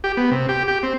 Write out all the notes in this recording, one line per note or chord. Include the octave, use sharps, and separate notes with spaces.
G4
B3
C3
G4
G4
C4